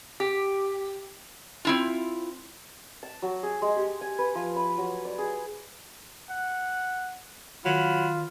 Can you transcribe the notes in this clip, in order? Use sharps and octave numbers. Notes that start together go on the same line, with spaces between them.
G4
C4 E4 F4
A5
F#3
G#4
G#3
G4
G#5
B4
F3
B5
F#3
D5
G#4
F#5
D#3 F#3 F4 B5